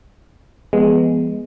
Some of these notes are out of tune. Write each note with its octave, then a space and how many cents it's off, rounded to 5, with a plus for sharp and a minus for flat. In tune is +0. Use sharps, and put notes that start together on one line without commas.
F3 -35 G#3 +0 B3 +0